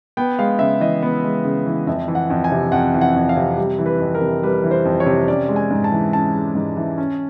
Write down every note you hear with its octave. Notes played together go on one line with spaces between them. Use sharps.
B3 G5
G#3 F5
C#3 E5
E3 D#5
B3
G#3
C#3
E3
F2 E5
E3
F#5
F2
G#5
C3
F2 F#5
E3
F#5
F2
F5
C3
G3
E3
B4
F2
A#4
C3
G3 B4
E3
C5
F2
C#5
C3
C#4 D5
G#3
G#5
G#2
A5
E3
C#4 A5
G#3
G#2
E3
C#4